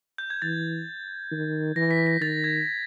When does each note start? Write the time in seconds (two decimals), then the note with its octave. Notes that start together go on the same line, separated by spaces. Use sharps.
0.18 G6
0.30 G#6
0.42 E3 A6
1.31 D#3
1.76 E3 A#6
1.91 B6
2.07 A#6
2.21 D#3 A6
2.44 G#6